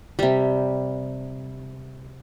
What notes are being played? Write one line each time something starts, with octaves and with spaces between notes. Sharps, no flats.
C3 G3